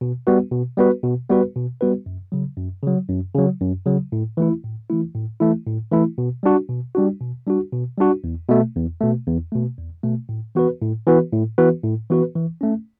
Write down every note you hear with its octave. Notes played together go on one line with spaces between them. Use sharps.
B2
G3 B3 F#4 B4
B2
G3 B3 F#4 B4
B2
G3 B3 F#4 B4
B2
G3 B3 F#4 B4
F#2
C#3 F#3
F#2
C#3 F#3
F#2
C#3 F#3
F#2
C#3 F#3
A2
E3 A3 E4
A2
E3 A3 E4
A2
E3 A3 E4
A2
E3 A3 E4
B2
G3 D4 F#4
B2
G3 D4 F#4
B2
G3 D4 F#4
B2
G3 D4 F#4
E2
B2 A3
E2
B2 A3
E2
B2 A3
E2
B2 A3
A2
E3 B3 F#4 B4
A2
E3 B3 F#4 B4
A2
E3 B3 F#4 B4
A2
E3 B3 F#4 B4
E3
A3 C#4